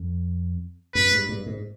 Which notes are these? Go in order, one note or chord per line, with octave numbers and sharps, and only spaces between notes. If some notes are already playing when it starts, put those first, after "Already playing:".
Already playing: F2
F#2 B4
G2
G2
G#2